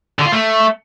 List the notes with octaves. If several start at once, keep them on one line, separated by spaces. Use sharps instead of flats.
D3
F4
A3